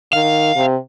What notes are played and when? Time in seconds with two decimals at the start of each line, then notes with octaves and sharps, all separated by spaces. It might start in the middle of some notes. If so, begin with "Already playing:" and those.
0.13 D#3 F5
0.56 C3